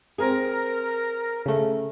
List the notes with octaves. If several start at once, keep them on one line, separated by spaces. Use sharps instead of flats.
C4 G#4 A#4
C#3 A3